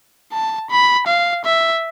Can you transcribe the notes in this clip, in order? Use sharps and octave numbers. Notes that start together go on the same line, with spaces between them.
A5
B5
F5
E5